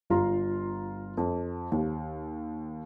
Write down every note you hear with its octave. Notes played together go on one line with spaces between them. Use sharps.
G1 F4 A#5 C6
F2
D#2